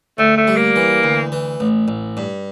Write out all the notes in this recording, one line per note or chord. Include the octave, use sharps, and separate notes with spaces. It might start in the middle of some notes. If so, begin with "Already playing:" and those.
D2 A3
A3
G3
A#3
E3
D2
E3
A1
A1
G2